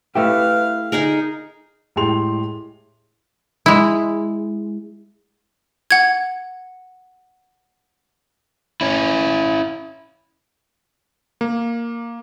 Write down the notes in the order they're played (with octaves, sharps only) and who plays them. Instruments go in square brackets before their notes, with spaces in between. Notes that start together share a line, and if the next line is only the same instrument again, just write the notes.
[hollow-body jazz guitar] A3 E4 G4 [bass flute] B4 [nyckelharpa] F5
[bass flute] D3 [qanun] D#4 G#4 A#4
[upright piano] A2 G#3 G4 G5 C6 F7
[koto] G#3 E4
[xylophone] F#5 G#6
[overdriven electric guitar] C#4 E4
[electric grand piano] A#3